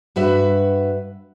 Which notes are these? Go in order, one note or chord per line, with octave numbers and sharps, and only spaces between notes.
G2 F#4 B4 E5